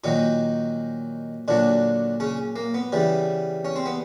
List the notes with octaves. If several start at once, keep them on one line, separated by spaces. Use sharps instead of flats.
A#2 D#3 F#3 D#4
A#2 D3 F#3 D4
C#3 C#4
A#3
B3
C#3 E3 G3
C#4
C4
B3